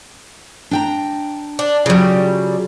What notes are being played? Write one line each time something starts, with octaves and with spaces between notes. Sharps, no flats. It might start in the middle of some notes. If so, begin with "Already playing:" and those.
D4 G5 A#5
D4
C#3 F#3 G3 F4